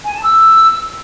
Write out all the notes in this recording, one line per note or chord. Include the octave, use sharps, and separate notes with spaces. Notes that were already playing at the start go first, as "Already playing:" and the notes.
G#5
A5
E6